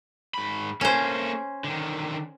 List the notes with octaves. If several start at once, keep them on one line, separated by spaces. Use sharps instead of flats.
G#2 B5
A#3 C#4 A4 C5
D3 D#3